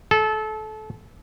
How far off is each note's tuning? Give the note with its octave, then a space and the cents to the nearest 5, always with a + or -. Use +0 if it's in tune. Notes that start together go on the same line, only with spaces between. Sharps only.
A4 -25